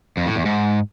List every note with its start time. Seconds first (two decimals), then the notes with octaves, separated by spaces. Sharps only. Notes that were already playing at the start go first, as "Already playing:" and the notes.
0.17 F2
0.26 A2
0.36 E2
0.45 G#2